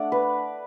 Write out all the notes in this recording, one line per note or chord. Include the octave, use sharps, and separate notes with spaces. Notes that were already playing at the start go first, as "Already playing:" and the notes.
Already playing: A3 D4 D5 F#5
B4